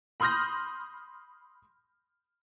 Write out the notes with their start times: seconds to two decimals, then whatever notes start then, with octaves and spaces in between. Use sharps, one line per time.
0.20 B5 C6 D#6 F6 G6 A#6